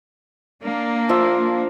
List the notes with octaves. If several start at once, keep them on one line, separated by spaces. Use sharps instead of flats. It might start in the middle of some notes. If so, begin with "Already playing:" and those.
A#3 D4
F3 E5